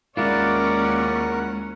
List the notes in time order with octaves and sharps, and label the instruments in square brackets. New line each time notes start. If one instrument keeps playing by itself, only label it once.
[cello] D#2 C#4 [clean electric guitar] G#3 E4 F4 [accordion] A#4 F#5 [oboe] D5